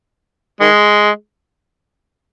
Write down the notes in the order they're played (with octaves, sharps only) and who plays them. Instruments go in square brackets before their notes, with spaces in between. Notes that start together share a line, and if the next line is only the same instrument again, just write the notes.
[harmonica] D#3 G#3